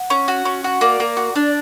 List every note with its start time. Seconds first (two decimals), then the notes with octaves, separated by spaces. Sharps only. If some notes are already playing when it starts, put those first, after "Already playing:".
Already playing: F#5
0.10 C#4
0.28 F#4
0.45 C#4
0.64 F#4
0.81 A#3 D5
1.00 A#3
1.17 F#4
1.35 D4